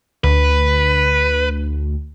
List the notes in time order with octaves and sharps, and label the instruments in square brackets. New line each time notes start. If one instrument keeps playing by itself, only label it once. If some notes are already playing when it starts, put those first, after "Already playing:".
[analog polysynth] D2 [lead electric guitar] B4